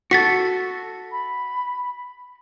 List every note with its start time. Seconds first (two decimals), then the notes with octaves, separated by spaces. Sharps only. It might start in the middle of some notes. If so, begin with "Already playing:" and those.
0.11 F#4 A4 A6 B6 C#7
1.12 B5